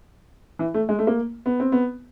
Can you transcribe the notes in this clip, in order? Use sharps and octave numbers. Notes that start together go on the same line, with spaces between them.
E3
A3
G#3
A3
A#3
B3
C4
B3